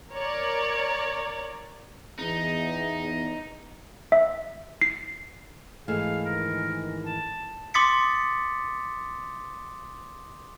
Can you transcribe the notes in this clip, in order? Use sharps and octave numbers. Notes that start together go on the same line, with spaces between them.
A#4 C#5 D5
E2 D#4
E5
C7
G#2 E3 A3 G#4 F5
D#3 A#4
A5
C6 D6 D#6 A6 B6 C#7